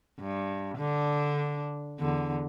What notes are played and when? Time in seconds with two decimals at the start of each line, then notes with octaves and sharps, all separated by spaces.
0.20 G2
0.78 D3 D4
2.00 E2 D3